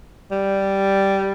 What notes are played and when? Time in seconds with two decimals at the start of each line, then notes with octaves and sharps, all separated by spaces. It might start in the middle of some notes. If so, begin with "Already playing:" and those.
0.32 G3